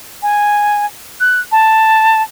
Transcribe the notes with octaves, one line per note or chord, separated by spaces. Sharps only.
G#5
F#6
A5